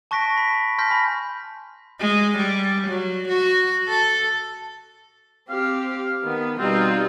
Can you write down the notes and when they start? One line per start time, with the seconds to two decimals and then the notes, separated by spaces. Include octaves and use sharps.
0.11 A5 C#6 F#6 A#6 B6 D7
0.36 B5 B6
0.52 B6
0.78 A5 C6 F6 G6 A#6 B6
0.90 G#5 B5 A#6 B6
2.00 G#3
2.38 G3
2.87 F#3
3.28 F#4
3.88 A4
5.50 C4 G4 F5
6.24 D#3 B3
6.59 B2 G3 C4 D#4 F4